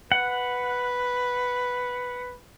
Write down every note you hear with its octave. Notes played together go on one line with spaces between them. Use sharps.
B4 F#5